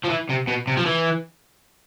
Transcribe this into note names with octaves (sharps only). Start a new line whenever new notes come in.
F3
E3
C3
B2
C3
F3
E3